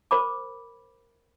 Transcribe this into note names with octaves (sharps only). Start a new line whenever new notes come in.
A#4 C5 B5 D6